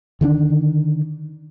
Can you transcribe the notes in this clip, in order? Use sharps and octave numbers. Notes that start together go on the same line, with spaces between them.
D3 D#3 G#3 D4